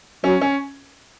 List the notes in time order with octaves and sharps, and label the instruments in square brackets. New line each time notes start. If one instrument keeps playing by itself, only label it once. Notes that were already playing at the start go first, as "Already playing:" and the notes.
[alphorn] F#3 [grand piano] C#4
[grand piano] C#4